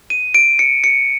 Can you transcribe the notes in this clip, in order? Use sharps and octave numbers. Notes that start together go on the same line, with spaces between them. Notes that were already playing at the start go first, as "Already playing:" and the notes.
D#7
D7
C#7
C#7